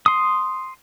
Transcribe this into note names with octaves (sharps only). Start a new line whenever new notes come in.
C6 D#6